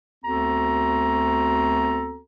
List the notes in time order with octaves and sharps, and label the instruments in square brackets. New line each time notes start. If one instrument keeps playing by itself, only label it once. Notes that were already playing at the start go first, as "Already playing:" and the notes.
[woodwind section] D2 B3 C4 F#4 A4 A#5